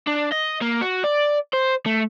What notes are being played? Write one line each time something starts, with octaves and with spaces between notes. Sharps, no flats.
D4
D#5
A#3
F#4
D5
C5
A3